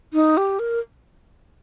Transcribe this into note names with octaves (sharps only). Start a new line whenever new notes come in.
D#4
G4
A#4